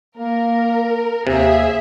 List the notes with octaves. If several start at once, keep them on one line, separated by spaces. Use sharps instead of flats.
A#3 A#4
D#2 C3 G#4 E5